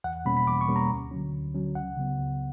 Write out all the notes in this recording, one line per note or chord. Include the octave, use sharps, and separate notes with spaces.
E2 F#5
B2 G3 A#3 C#4 B5
B5
E2 D6
C#6
B2 G3 A#3 C#4
A#5
D2
D3 F#3 C#4
D2
D3 F#3 C#4
C#2 F#5
C#3 F#3 B3
C#2